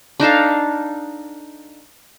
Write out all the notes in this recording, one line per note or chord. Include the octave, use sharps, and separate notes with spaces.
D4 D#4 A4 F5